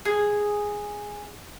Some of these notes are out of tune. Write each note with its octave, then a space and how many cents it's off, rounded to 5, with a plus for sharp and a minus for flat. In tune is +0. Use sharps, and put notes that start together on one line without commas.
G#4 -5